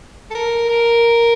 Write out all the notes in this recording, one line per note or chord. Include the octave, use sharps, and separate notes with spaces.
A4
A#4
A#4